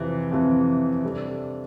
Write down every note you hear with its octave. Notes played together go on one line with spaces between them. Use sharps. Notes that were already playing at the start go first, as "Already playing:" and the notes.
Already playing: F2 C3 E3
F2 C3 E3
C3 G3 D4 A4